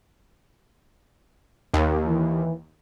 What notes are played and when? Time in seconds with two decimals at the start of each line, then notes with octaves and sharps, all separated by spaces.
1.74 D#2
2.05 E3